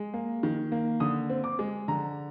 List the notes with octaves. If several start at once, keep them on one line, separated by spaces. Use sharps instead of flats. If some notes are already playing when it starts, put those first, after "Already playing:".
Already playing: G#3
A#3
D#3
A#3
D3 D#6
C4
D6
G#3
D3 A#5